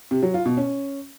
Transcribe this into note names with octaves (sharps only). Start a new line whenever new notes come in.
C3
F#3
F4
B2
C#4